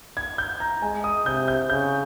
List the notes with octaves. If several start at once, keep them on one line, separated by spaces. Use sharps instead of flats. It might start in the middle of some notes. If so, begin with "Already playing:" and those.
G#6
G6
A#5
G#3 G#5
D#6
C3 G6
G6
C#3 G6